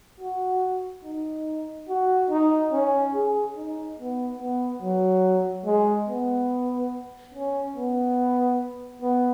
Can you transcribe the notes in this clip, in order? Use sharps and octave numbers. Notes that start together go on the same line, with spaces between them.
F#4
D#4
F#4
D#4
C#4
G#4
D#4
B3
B3
F#3
G#3
B3
C#4
B3
B3